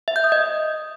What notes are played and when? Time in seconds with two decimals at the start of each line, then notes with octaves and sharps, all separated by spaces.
0.08 E5
0.16 G6
0.24 D#6
0.32 D#5